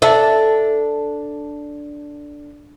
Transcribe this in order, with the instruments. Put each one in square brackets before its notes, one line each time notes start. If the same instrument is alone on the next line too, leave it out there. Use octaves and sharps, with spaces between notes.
[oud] D4 A4 E5